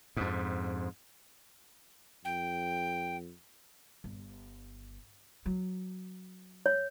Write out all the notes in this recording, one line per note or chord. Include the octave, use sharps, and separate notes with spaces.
F2 G#2
F2 G5
G1
F#3
C#5